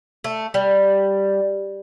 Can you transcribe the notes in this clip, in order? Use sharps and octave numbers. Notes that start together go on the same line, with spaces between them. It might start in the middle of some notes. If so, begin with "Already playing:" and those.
A3
G3